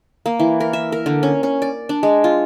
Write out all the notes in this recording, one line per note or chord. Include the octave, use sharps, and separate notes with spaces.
A#3
E3
A#4
E5
A#4
D3
C#4
C#4
D5
D4
G#3
F4